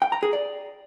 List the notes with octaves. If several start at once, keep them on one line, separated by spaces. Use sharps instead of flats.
G5
A#5
G#4
D5